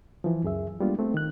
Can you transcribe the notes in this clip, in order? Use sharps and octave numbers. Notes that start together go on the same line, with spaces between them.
E3 F3
C#2 F#2 G#4 E5
G3 G#3 A#3 B3 D4 F4
A3 C4
D#3 F#6